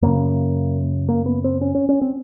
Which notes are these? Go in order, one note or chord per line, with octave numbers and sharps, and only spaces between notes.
F#2 C#3 A#3
A#3
B3
C4
C#4
C#4
C#4
C4